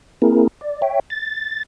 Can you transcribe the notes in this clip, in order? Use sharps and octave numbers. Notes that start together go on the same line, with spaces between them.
A#3 C4 E4 G#4 A#4
D5
C#5 E5 G5
A6